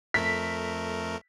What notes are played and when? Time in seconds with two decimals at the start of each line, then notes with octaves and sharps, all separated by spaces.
0.14 F2 A3 A#4 B6